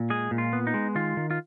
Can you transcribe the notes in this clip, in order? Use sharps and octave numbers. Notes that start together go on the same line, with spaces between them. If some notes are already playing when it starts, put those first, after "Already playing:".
Already playing: A#2
G#3 G#4
A#2
F4
B3
D#4
G#3
D#3 F4
D#3
F4